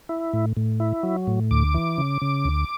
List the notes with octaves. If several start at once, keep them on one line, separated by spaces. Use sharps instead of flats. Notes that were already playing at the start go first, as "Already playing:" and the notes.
E4
A2
A2
E4
F#3
A2
D2 D6
E3
C#3
C#3
D2